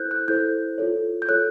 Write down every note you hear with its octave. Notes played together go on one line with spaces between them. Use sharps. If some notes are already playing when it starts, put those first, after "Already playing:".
Already playing: E4 A4 C5 F#6 G6
F#6
E4 A4 C5 G6
F4 A4 C#5
G6
F4 A4 C#5 F#6